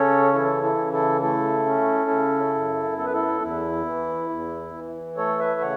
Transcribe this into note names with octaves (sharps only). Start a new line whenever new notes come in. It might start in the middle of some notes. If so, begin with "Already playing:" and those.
Already playing: C#3 C#4 A4 C#5
E3 E4 A4
E4 A4
C#3
E4 A4
A3 E4 A4
C#4
C#3
F#2
B3 A4
B4
E4 A4
E2 E4
E3
E2
E3
A3 A4 C#5
B4 E5
C#3 C#5 F#5